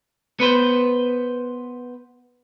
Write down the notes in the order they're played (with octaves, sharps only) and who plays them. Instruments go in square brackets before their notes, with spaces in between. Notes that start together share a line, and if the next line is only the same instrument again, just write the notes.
[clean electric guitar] B3 B4 C5